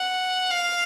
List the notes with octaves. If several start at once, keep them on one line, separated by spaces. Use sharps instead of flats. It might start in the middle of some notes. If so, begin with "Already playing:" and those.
Already playing: F#5
F5